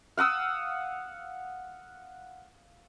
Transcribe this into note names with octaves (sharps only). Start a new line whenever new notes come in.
F5 F#5 D#6 E6